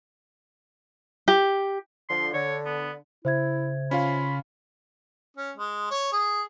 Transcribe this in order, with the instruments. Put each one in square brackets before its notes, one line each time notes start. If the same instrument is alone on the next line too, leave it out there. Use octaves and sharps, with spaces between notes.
[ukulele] G4
[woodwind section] D3 F3 [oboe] C6
[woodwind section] D3 [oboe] C#5
[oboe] B3
[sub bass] C#3 [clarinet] E4 [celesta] C5 E5 G#6
[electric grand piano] C#4 F4 F5 [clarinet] B5
[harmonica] C#4
G#3
C#5
G#4